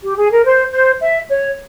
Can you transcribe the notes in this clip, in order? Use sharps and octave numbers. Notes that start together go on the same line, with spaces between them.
G4
G#4
A#4
C5
C5
E5
C#5